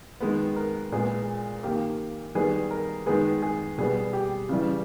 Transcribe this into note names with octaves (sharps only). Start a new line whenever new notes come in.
D#3 G#3 B3 B4
A#4
A#2 G#3 B3 G#4
D#3 A#3 G4
D#3 G3 B3 G#4
A#4
D#3 G#3 B3 G#4
G#4
B2 G3 B3 G#4
G4
C#3 E3 G3